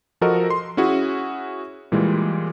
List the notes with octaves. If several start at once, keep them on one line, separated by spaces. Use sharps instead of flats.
F3 F#4 A4 A#4 D#5
C6
C#4 E4 F#4 G#4
A#2 E3 G3 G#3